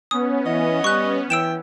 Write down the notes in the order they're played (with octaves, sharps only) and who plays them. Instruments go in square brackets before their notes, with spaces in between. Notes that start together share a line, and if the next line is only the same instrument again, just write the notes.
[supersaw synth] B3 C#4 [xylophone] D#6
[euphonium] E3 [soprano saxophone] D#5
[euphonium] G3 [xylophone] C#6 F#6
[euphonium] E3 [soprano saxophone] G5 [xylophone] E6 D7 E7